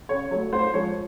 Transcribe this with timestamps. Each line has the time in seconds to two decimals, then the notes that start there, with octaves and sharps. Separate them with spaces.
0.09 C#3 C#5
0.31 F#3 A3 C#5
0.52 A2 C5
0.74 F3 G#3 C#5